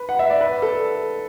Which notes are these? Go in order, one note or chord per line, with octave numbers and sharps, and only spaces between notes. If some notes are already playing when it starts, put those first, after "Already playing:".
Already playing: B4
F#5
E5
D5
B4
A4